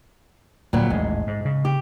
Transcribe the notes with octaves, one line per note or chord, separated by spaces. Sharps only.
D1 A#2 F#3 G3
A1 D#2 G#2 G#3
G#2
C#3
G4